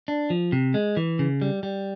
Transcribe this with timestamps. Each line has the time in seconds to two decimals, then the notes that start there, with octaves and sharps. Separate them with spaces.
0.08 D4
0.30 F3
0.52 C3
0.74 G#3
0.97 E3
1.19 C#3
1.42 G3
1.63 G3